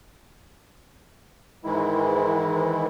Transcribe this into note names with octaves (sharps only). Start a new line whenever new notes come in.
G#2 D#3 E3 G#3 E4